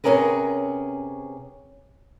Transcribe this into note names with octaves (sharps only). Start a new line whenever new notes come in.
C3 G#3 C#4 G#4 A#4 B4